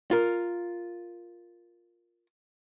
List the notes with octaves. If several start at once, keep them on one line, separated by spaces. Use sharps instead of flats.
F4 A#4